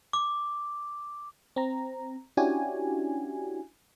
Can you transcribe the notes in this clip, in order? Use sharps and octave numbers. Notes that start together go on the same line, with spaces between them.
D6
C4 A#5
C#4 D4 E4 F#4 G4 G#5